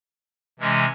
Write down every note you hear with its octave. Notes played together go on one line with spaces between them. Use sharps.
C3 E3 G#3 C#4